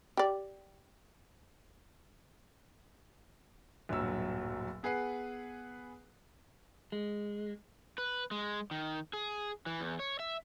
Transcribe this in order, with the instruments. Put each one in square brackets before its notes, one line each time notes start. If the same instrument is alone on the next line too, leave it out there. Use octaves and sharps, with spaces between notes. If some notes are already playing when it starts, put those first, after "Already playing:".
[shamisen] G4 D5
[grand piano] D1 G1 A#2 F#3 E6
B3 G#4 B4 F#5 C7
[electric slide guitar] G#3
B4
G#3
D#3
G#4
E3
E2
C#5
E5